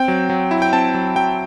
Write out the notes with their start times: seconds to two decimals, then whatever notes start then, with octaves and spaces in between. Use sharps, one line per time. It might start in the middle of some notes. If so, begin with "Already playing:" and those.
Already playing: C4 G5
0.08 F#3
0.30 F#3
0.51 E4
0.62 G5
0.73 C4 A5
0.94 F#3
1.16 F#3 G5